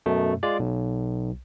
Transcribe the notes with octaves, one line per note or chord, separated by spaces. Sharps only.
F#2 B2 A3
G#3 F4 D5
B1